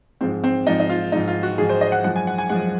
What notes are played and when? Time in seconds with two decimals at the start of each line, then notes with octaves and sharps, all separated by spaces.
0.21 G#2 F3 G#3 C4
0.44 C4
0.67 G#2 F3 G#3 D#4
0.80 D#4
0.89 F4
1.12 G#2 F3 G#3 D#4
1.28 F4
1.43 F#4
1.58 G#2 F3 G#3 G#4
1.69 C5
1.81 D#5
1.92 F#5
2.04 F#2 F3 G#3 F#5
2.16 G#5
2.27 F#5
2.38 G#5
2.49 F#2 F3 G#3 F#5